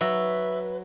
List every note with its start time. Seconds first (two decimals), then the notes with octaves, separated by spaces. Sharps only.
0.01 F#3 B4 E5